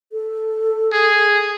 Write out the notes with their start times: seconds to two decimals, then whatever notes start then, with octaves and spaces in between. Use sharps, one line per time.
0.12 A4
0.92 G#4